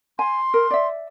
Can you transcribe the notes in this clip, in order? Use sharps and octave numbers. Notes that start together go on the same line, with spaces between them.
G#5 C6
A#4
D5 E5